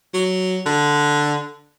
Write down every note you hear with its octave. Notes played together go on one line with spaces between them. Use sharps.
F#3
D3